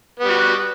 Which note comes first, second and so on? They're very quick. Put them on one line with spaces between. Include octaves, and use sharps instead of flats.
B3 G3 F#4